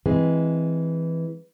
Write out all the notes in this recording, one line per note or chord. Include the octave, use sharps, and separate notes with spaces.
E3 G#3 C4